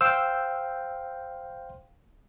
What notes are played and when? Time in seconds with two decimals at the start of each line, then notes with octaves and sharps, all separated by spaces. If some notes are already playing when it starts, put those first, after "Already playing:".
0.01 C5 F5 G5 E6